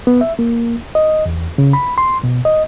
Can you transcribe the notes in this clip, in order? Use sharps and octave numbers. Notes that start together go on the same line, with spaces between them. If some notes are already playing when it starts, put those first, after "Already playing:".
B3
E5
A#3
D#5
E2
C#3
B5
C6
B2
D#5